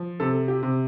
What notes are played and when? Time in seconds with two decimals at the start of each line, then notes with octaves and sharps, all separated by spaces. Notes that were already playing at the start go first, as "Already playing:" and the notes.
Already playing: F3
0.20 C3 A4
0.48 G4
0.63 C3